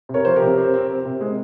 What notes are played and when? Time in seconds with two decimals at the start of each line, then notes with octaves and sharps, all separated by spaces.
0.09 C3
0.14 A#4 C#5
0.25 F3 C5
0.36 C3 G4 A#4
0.58 C4
0.74 C4
0.89 C4
1.05 C3
1.21 G#3